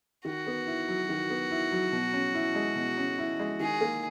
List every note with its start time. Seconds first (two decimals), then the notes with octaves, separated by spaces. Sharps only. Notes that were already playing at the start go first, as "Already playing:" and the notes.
0.25 D#3 F#4
0.47 B3
0.66 E4
0.88 F#3
1.09 D#3
1.30 B3
1.51 E4
1.72 F#3
1.92 B2
2.13 C#4
2.34 E4
2.55 G#3
2.76 B2
2.97 C#4
3.18 E4
3.39 G#3
3.60 D#3 G#4
3.81 A#3